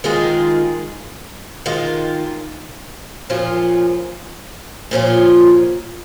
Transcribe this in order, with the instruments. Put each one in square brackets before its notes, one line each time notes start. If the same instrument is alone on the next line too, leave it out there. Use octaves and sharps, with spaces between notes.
[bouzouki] D#3 G#3 F4 G#4
D#3 G#3 F4
A#2 F3 C#4 F4
A#2 F3 C#4 F4